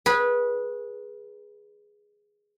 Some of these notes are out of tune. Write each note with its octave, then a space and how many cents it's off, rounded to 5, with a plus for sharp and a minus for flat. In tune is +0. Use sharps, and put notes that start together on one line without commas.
G#4 +0 B4 -20